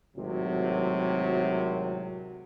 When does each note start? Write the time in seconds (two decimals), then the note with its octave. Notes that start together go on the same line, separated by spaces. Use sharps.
0.17 G#1 A2 C3 F#3